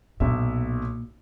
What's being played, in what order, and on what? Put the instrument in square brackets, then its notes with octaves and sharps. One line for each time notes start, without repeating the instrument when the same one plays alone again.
[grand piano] B1 E5 [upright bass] A#2